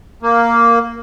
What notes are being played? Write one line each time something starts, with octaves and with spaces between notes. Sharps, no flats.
A#3